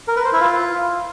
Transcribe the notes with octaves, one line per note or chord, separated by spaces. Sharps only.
A#4
B4
C5
E4
F4